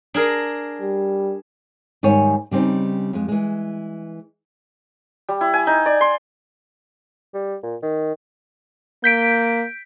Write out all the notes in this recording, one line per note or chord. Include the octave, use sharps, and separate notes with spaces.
D4 G#4 A#4
G3
G#2 D#3 G3 C#5 G#5
C#3 G3 C4 D#4
F2 G#3
E3 G#3
G3
E4
G#5
D#4
D5
C6
G3
A#2
D#3
A#3 G6 B6 D7